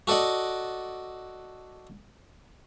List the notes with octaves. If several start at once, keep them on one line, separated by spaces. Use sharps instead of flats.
F#4 A4 D5 D#5 F#5